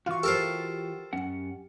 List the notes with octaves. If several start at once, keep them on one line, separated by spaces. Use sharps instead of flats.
E3 F4 F#4 F5 C#6
G4 A4 A#4 C5 A6
F#2 C#4 F#5